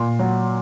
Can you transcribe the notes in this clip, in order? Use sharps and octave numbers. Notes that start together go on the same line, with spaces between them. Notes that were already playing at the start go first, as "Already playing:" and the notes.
Already playing: A#2 C6
F#3